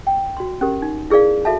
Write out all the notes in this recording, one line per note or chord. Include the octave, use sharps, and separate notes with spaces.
G5
F#4 C6
C#4 G4 A#4
D#4
E4 G#4 A#4 D5 F5
F#4 A4 E5 F5 A5